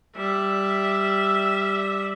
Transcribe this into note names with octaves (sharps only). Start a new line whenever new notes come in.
G3 E5